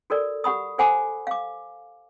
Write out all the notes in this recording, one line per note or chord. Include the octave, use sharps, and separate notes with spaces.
F#4 A4 A#4 D5
G4 F#5 B5 D#6
A4 C5 F#5 G#5 B5 D6
F5 D6